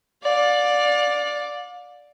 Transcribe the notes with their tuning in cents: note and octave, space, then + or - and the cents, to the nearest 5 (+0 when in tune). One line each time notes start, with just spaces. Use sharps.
D5 +0 F5 +40